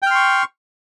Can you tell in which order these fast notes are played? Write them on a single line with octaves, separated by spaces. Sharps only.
G5 F6 C6 C#6